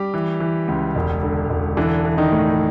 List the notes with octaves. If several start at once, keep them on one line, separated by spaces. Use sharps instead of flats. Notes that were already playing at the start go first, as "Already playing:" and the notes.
Already playing: G3 G4
E3
E3
C#2
E1
D3
E1
D3 E3 D4
E3
D#3 D#4
A2